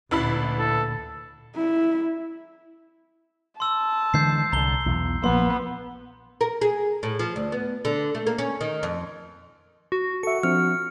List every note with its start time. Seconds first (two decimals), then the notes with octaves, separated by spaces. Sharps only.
0.11 A1 D2 A#2 E4 B5
0.58 A4
1.56 E4
3.60 A5 C6 E6
4.14 D3 E3 G#3 G6 C7
4.52 C2 D3 A#5 G7
4.86 B1 E2
5.24 A#1 F3 A#3 B3 C6
6.41 A#4
6.61 G#4
7.03 A2
7.19 F3
7.36 D2
7.52 B3
7.85 D3
8.15 A3
8.27 A#3
8.38 C#4
8.61 D#3
8.83 F2
9.92 F#4
10.23 F#4 A4 E5 C#7
10.43 F3 C4 D4 F6